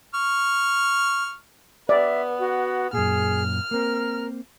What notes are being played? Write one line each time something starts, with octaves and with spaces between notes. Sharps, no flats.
C#6 F6
B3 D5 E5
F#4
F#2 A#2 G#4 F6
A#3 C4 A#4